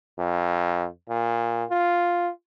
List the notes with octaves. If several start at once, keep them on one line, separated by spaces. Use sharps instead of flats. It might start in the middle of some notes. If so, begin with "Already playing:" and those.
F2
A#2
F4